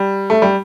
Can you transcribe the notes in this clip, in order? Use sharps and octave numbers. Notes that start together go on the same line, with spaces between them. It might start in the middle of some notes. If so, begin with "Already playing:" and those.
Already playing: G3
A3
G3